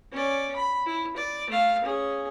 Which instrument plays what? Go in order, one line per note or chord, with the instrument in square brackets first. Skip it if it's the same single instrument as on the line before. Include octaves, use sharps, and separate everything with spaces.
[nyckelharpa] C#4 D5
B5
E4
D5
A3 F5
C#4 G#4